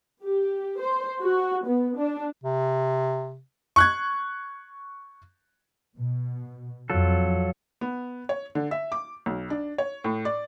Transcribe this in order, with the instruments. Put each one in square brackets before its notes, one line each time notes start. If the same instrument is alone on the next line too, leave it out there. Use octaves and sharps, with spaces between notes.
[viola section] G4
C5
F#4
B3
D4
[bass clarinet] C3
[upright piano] C#6 F#6 G#6
[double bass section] B2
[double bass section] F2 [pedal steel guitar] F#3 F4 A4
[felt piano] B3
C#5
D3
E5
D6
B1
D4
C#5
A2
D5